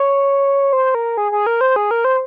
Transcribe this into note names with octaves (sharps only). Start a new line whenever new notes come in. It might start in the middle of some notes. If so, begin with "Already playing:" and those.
Already playing: C#5
C5
A#4
G#4
G#4
A#4
C5
G#4
A#4
C5